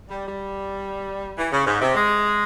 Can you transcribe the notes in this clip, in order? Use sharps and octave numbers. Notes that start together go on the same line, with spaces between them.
G3
G3
E3
C#3
G#2
C3
G#3